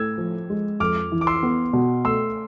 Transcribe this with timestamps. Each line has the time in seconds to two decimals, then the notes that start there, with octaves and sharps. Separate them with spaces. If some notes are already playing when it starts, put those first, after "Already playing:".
Already playing: A2 E6 G#6
0.18 F3
0.50 G#3
0.80 F2 D6 F6
1.12 E3
1.21 D6
1.27 C6 E6
1.43 B3
1.73 B2
2.05 A3 C6 E6